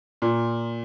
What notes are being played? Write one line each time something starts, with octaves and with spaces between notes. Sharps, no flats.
A#2